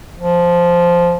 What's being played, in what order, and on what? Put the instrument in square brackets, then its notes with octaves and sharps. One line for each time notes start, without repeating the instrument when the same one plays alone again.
[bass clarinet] F3